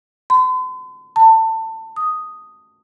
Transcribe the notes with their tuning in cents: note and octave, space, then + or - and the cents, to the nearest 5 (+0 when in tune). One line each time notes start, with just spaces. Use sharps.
C6 -45
A5 +25
D#6 +0